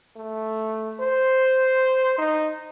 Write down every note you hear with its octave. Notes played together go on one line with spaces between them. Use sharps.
A3
C5
D#4